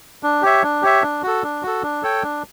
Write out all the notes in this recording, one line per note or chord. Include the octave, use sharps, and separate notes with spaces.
D4
G4 C#5 E5
D4
G4 C#5 E5
D4
F#4 A4
D4
F#4 A4
D4
A4 C#5 G5
D4